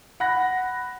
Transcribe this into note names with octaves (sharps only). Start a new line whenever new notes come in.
F#5 B5 F#6 A#6